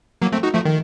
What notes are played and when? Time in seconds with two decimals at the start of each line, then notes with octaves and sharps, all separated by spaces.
0.22 F#3 A#3
0.32 A3 C4
0.43 D#4 F#4
0.54 F3 A3
0.65 D#3